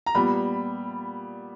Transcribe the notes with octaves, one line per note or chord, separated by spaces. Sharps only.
A#5
A#2 G3 B3 B5